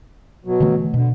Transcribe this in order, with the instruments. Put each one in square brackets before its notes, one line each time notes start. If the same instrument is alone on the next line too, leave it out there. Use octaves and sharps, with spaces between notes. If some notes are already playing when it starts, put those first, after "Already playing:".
[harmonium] B2 F#3
[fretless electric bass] D3 E3 A3
[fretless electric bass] B2 [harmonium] D3